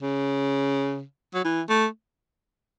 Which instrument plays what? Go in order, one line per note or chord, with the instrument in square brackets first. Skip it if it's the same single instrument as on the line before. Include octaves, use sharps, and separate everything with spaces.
[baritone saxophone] C#3
F#3
E3
A3